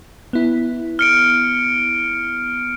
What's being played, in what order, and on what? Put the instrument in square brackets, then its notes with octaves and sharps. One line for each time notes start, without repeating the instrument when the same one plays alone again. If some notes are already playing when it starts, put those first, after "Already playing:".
[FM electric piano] B3 E4
[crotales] F6 C#7 D7